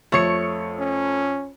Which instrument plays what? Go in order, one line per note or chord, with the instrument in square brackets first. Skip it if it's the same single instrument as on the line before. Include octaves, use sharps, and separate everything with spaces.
[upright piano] F2 C#7 [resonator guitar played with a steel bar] A3 C#5
[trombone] C#4